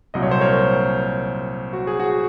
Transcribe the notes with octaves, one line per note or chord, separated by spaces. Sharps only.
C2 A#2 F#3 D#5
C#5
C5
A#4 C#5
F#4
G#4
F#4